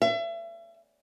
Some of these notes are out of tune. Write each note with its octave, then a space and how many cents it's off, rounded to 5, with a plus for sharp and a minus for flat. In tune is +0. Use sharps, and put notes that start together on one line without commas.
E5 +35